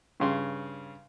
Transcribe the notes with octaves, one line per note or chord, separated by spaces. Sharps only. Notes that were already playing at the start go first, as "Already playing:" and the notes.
G2 C#3 C6